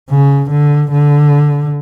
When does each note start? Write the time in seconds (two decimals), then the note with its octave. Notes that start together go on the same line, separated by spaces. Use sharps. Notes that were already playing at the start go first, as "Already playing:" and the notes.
0.10 C#3
0.51 D3
0.92 D3